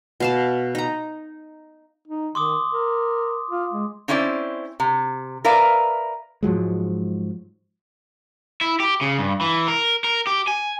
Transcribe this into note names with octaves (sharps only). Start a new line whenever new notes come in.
B2 F5 A5
D#4 A#5
D#4
D#3 C6 D6 D#6
A#4
F4
G#3
C4 C#4 E4 C5 D5
C3
A#4 B4 D5 E5 F5
G#2 F3 F#3 G#3
E4
G4
C#3
G2
E3
A#4
A#4
G4
G#5